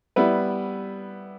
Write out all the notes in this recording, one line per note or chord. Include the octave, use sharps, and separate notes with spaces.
G3 B3 E4 B4